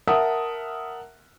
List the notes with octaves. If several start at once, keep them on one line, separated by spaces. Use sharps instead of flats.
A#4 E5 F#5 A5 D#6